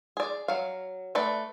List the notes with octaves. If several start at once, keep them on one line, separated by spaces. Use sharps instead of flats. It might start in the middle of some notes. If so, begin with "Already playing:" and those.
G#4 D5
F#3 F5
A3 B4 D5